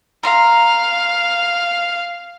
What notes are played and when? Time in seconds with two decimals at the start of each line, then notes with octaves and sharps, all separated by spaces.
0.23 F5 A#5 C6